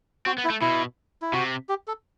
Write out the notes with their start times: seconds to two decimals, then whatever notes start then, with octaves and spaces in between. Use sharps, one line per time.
0.26 C4 F#4
0.38 B3
0.45 E4
0.50 A3
0.61 B2 E4
1.22 E4
1.33 C3 F#4
1.69 G4
1.87 A4